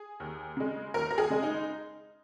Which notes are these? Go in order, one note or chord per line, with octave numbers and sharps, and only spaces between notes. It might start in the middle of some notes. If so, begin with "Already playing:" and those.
Already playing: G#4
D#2
C#3 G#3
D#2 A#4
A#4
G#4
C#3 G#3
D#4